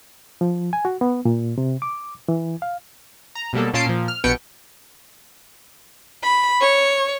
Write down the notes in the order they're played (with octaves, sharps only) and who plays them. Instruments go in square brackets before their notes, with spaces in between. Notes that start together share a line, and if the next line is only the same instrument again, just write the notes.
[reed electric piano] F3
G#5
F#4
B3
A#2
C3
D6
E3
F5
[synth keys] A#5
B2 F#3 G3 A#3 A4
A#2 C#4 F4 A5 C7 D7
A#2 F3
F6
A#1 B2 B3 B4 G5 C#7
[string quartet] B5
C#5